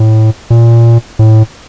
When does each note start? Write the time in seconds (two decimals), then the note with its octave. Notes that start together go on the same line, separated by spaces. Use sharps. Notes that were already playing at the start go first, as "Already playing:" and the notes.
Already playing: A2
0.50 A#2
1.19 A2